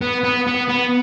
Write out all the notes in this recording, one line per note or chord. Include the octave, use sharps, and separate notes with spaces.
B3
B3
B3
B3